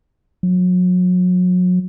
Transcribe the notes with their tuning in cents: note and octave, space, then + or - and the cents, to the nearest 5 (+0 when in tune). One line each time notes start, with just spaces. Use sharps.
F#3 -35